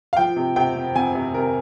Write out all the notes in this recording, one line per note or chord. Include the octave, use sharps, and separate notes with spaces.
F5
F3 G5
C3
C3 G5
F2
F2 G#5
C3
C3 A#4